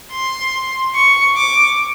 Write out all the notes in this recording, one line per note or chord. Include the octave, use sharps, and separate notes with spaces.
C6
C#6
D6